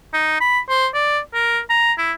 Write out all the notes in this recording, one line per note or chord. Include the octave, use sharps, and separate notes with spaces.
D#4
B5
C5
D5
A#4
A#5
E4